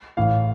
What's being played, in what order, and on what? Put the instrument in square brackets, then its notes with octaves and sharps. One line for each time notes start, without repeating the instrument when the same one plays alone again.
[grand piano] A1 A2 E3 F5